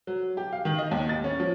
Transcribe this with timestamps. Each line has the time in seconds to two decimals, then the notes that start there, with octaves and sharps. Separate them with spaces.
0.07 F#3
0.37 G4
0.52 F5
0.65 D#3
0.78 D#5
0.91 D#2
1.09 A6
1.24 C#4
1.40 F3